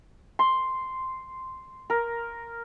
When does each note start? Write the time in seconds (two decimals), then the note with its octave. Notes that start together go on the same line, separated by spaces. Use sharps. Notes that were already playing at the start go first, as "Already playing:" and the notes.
0.39 C6
1.90 A#4